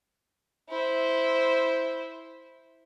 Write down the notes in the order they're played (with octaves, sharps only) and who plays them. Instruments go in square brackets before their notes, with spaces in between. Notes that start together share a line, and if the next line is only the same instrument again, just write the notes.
[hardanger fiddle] E4 C5